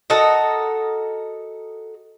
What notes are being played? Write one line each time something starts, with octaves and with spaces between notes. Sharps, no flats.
F#4 A4 A#4 D#5